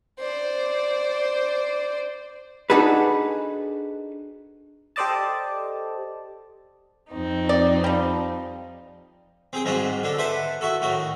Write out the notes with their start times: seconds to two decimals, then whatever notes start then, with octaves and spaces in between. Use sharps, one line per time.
0.19 C5 D5
2.70 D4 D#4 F#4 G#4 A4 B4
4.96 G4 A4 C5 D5 D#5 A5
7.13 F2 C4 D#4
7.49 D5
7.84 F3 G3
9.53 C4 G#4 G5
9.65 G#2 G3 G#3 C4 F4 F#4
10.03 D3 D4 A4
10.18 B4 C5 E5 F#5 A5
10.61 E4 F#4 A4
10.82 A2 D#3 F#4